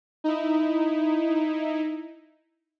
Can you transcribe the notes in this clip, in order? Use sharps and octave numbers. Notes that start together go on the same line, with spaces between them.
D#4 E4